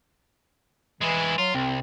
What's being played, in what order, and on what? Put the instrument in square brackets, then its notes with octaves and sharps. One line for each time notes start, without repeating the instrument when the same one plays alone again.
[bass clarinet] E3 [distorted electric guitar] G#3 E4
[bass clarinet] F#3 [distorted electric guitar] F4
[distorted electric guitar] C2 [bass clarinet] C4